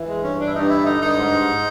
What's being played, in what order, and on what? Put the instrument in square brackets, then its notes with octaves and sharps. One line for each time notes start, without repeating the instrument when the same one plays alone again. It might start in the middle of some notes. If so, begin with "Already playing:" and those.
Already playing: [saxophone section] E3
G#3
G2
C#4
E3
D4
E4
G2 D#4
E4
D3
D#4
G2 D#4
G#2
G#2